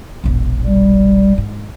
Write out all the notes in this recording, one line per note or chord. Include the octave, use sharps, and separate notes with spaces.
E1 A#1
G3
G#2